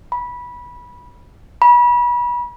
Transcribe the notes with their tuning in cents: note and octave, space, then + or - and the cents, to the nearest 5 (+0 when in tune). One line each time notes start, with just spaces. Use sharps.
B5 -15
B5 -30